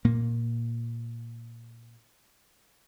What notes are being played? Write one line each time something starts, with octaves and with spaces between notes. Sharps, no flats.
A#2 A#3